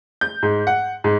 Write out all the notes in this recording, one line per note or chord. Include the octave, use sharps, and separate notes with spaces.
G6
G#2
F#5
G#2